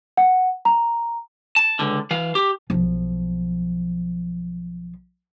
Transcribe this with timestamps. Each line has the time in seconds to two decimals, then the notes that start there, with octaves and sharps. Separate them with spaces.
0.17 F#5
0.65 A#5
1.56 A5
1.79 C#2 D3
2.11 E3 F5
2.35 G4
2.70 B1 F3